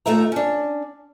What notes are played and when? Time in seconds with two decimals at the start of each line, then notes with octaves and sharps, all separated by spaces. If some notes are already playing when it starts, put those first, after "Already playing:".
0.06 D#2 A#2 A3 D#4 E5 A#5
0.32 C#4 D4